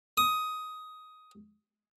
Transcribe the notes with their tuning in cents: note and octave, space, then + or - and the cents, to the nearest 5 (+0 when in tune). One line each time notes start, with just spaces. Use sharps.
D#6 +10